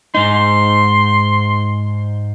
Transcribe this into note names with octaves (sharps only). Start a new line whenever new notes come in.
G#2 D#4 C6